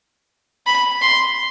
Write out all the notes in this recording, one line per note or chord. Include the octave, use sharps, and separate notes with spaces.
B5
C6